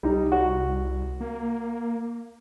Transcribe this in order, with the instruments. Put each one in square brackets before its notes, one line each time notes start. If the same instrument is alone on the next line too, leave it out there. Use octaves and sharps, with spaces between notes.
[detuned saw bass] C2 [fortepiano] G3 D#4
[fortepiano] F#4
[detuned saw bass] A#3